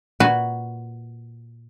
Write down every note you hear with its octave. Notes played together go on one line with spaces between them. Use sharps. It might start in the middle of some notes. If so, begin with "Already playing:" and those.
A#2 F#4 B4 G#5